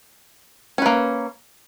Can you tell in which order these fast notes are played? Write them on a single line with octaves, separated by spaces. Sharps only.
C#4 B4 A#3